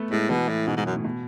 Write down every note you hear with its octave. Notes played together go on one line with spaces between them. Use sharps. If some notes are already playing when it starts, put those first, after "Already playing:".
Already playing: A3 B3
A2 G#3
B2 E3
A2
G#2 B2
G#2
F#2
A2
B2